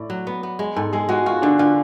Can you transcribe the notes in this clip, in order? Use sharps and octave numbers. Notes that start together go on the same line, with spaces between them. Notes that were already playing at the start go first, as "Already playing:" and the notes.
Already playing: A2 D5
F#3
B3
B3
G#3
G#2 A4
G#3 G#4
G#3 F#4
F4 F#4
D3 D4
D3 F4